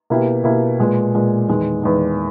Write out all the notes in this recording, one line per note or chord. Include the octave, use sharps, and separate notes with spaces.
B2 A#3 E4 G4
B2 A#3 E4 G4
A#2 G#3 B3
A#2 G#3 B3
E2 D#3 G#3
E2 D#3 G#3